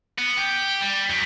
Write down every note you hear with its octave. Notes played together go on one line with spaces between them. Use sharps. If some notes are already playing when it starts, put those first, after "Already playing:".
B3
G4
G3
F#2